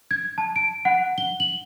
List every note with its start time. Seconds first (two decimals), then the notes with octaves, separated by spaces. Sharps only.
0.11 G#6
0.38 A5
0.56 D7
0.85 F#5
1.18 G7
1.40 F#7